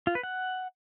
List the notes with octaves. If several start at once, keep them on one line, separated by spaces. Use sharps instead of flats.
F4
B4
F#5